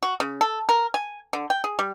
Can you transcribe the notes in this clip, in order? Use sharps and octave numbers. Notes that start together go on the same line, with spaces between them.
F#4
C#3
A4
A#4
G#5
D3
G5
G#4
G3